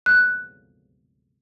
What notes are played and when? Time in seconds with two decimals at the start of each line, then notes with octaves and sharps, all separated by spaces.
0.06 F#6